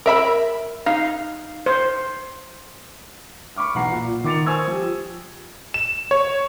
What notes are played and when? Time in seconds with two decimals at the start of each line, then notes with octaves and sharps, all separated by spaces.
0.06 A#4 E5 B5
0.86 D#4 F5
1.66 C5
3.56 B5 C#6 D6 F6
3.75 B1 E2 F#5 A#5 C7
3.92 A#2
4.24 D#3 D6 A6 C#7 F7
4.46 C5 G#5 C#6 D#6 E6 G#6
4.67 F3 G4
5.74 E7
6.11 C#5